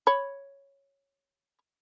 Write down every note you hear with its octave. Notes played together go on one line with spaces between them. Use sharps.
C#5 B5